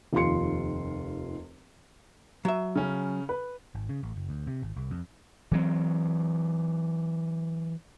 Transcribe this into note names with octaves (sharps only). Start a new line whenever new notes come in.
F1 D#2 F4 G4 C6 C#7
F#3 E5
C#3 C#4
B4
G#1
C#3
A1
F#1
D2
C3
G#1
C2
F2
E3 F#3 C4